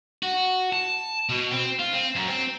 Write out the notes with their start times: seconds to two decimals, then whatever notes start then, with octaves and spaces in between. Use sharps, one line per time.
0.23 F#4
0.72 A5
1.29 B2
1.51 C4
1.80 F4
1.94 C4
2.16 F#2
2.28 C4